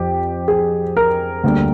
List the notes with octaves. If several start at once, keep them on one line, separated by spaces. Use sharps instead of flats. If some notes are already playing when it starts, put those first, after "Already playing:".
Already playing: F2 F3 G4
G#4
A#4
D2 D3 G3 A#3